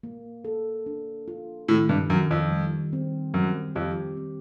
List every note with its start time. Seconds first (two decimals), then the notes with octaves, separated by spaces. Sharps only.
0.03 A#3
0.45 A4
0.86 D4
1.28 F4
1.68 A2 D#3
1.89 G2
2.10 F#2 D#3
2.31 F2
2.51 G3
2.93 C4
3.34 F#2 G3
3.75 F2 G4
4.17 C4